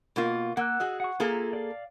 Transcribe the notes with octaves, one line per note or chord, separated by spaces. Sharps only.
B2 A#3 F4
A#3 F#5 E6 F#6
F#4 G#4 D#5
F#5 C#6
A#3 F4 G#4 A4 E5 A#5
D5 F5